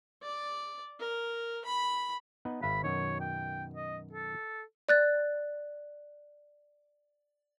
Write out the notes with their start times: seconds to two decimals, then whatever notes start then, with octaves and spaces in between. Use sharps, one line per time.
0.23 D5
1.00 A#4
1.65 B5
2.45 B3 D#4 B4
2.63 G#1 E5 F5 B5
2.84 F#2 B2 D#3 C#5
3.20 G5
3.75 D#5
4.13 A4
4.89 D5 F#6 A6